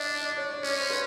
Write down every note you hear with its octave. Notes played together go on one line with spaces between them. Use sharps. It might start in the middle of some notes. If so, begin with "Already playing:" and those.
Already playing: D4 D5 D#5
D5
D5
C#5
D5
C#4 C#5
C5
B4